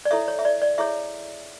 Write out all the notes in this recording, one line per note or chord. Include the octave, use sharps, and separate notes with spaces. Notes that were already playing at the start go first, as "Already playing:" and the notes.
D5
E4 A4 C#5 E5
C#5
E5
D5
D5
E4 G#4 C#5 E5